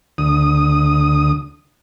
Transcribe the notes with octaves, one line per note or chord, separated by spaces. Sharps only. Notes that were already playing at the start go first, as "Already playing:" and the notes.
D2 D#6